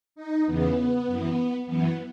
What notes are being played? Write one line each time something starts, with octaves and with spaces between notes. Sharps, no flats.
D#4
E2 C#3 E3 B3
F#2 E3
F#2 E3 B3